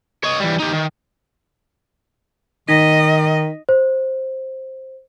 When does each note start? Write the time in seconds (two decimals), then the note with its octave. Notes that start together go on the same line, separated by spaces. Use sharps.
0.24 C#5 D#5
0.40 E3 G3
0.60 D#4 G4
0.73 D#3
2.68 D#3 D#4 D#5 A#6 B6
3.69 C5